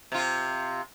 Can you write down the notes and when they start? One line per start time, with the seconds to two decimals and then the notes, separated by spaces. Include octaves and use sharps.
0.12 C3 F4